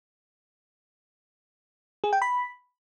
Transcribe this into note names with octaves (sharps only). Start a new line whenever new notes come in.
G#4
G5
B5